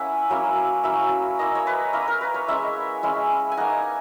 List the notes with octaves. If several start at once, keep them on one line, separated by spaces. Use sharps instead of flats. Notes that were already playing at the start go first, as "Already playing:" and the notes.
Already playing: A#3 C#4 E4 E5 F#5 G#5
F#3 A#3 C#4 E4
F#3 A#3 C#4 E4 E5
A#3 E4 D#5
C#5
B4
A#3 E4 A#4
A#4
B4
C#5
G#3 C#4 E4 E5
G#3 C#4 E4
G#5
A#3 D#4 F#5